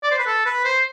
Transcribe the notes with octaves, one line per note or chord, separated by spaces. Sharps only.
D5
C5
B4
A4
B4
C5